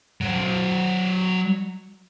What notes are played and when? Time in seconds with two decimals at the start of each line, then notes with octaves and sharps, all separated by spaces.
0.21 F#3 C5